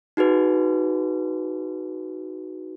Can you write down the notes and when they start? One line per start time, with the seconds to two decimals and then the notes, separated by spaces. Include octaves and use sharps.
0.17 D#4 F#4 G#4 B4